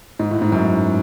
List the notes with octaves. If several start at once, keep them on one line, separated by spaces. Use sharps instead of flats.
G#2
A2
G#2
F#2